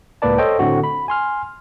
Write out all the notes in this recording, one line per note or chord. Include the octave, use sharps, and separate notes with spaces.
C#2 A2 A#3 B4 D5 A5
A4 C5 C#5 D#5 G5
A2 D3 C4 F#4
B5
G#5 C6 F6